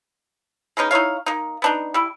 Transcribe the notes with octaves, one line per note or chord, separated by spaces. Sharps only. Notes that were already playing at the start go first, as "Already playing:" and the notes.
G#3 B3 C#4 D#4
D#4 E4 C#5 F5
A#3 D#4
B3 D4 D#4
G3 E4